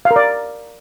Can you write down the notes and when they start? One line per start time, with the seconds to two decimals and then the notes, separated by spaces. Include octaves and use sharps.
0.05 F5
0.11 A#4
0.16 D5